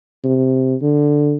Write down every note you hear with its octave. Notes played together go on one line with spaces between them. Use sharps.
C3
D3